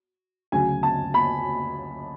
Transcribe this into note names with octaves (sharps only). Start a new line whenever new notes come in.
D2 C#3 F#3 G#5
A5
B5